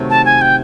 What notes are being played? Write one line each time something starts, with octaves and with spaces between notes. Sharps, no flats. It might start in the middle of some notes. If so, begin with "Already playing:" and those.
Already playing: C3 D#3 F#3 A3
A5
G#5
G5